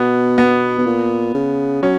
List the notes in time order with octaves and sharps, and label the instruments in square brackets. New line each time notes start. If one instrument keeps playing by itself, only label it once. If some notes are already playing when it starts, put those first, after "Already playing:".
Already playing: [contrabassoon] B2 [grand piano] B3
[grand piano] B3
[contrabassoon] B2
A#2
C#3
[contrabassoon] F#3 [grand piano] C#4